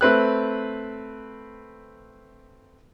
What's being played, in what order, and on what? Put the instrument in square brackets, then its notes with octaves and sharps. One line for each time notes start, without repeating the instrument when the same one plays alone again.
[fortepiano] A3 C4 B4 F#6